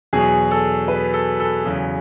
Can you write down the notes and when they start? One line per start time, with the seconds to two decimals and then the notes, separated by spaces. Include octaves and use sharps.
0.13 E2 B2 F#3 G#4
0.51 A4
0.88 B4
1.14 A4
1.40 A4
1.64 E2 C#3 F#3